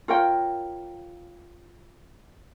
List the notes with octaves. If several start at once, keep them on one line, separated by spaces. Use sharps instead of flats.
F4 A#4 C#5 G5